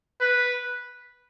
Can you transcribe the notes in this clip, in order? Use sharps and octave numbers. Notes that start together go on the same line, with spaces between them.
B4